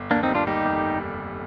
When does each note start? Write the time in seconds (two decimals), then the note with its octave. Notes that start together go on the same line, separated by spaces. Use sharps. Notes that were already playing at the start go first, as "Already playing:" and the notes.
Already playing: G1
0.11 D#2 A#3 D4
0.23 C4 D#4
0.29 G3
0.34 D4 F4
0.47 G3 D#4 G4
0.65 F1